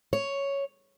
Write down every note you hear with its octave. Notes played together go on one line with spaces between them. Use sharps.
C#5